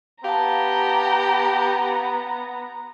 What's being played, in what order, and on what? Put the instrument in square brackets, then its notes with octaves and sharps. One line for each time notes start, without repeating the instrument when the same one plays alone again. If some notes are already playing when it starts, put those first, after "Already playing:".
[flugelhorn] B3 [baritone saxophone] G4 [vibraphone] F5 A5 [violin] A#5